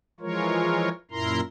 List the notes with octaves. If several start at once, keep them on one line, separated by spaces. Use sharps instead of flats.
E3 F3 G#3 F4 A#4 C#5
F#2 A#2 E4 A#4 A#5 C6